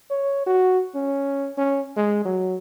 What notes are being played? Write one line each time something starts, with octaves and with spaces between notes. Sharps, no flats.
C#5
F#4
C#4
C#4
G#3
F#3